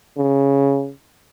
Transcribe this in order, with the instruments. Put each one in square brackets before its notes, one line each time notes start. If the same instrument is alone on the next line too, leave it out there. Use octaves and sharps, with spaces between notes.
[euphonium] C#3